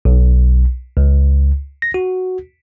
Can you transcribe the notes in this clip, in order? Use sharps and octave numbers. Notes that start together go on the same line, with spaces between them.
B1
C#2
A#6
F#4